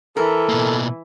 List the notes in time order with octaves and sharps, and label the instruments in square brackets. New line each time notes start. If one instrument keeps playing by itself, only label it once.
[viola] E3 [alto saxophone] A4 [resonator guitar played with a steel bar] A#4
[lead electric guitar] B2 A#3